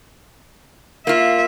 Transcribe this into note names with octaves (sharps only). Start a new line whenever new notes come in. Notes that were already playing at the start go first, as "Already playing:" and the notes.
A#3 F4 E5